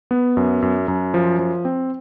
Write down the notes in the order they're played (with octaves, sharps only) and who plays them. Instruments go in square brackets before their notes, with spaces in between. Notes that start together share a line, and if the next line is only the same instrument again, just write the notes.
[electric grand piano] B3
F#2
F#2
F#2
F3
F3
C4